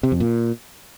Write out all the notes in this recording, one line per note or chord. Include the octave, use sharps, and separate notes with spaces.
C3
F2
A#2